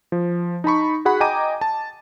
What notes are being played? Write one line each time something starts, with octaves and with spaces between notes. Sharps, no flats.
F3
D#4 A5 B5 C#6
F#4 G#4 F#5 B5
D#5 G5 G#5 A#5 D6 D#7
A5